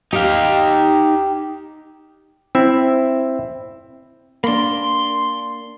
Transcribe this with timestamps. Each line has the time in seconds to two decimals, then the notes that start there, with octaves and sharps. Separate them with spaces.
0.13 D#4 G4 F5
2.55 C4 E4 E5
4.44 A#3 D4 B5 C6